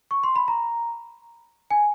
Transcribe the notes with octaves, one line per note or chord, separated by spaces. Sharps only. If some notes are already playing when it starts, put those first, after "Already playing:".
C#6
C6
B5
A#5
G#5